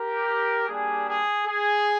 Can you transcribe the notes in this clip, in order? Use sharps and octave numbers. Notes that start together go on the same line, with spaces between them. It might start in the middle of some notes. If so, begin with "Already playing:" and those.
Already playing: G4 A#4
G3 A#3 D4 G4 G#4
G#4
G#4